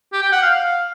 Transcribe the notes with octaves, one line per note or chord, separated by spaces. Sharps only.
G4
G5
F#5
F5